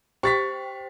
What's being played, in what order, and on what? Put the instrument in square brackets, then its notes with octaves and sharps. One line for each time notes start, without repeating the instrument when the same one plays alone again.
[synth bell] G4 C5 G5 [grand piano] C#6 A6 B6